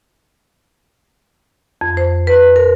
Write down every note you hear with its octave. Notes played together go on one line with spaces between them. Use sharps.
F2
C5
B4
A#4